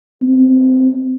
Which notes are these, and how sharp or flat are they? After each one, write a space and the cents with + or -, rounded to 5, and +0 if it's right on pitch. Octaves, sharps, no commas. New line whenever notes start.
C4 -15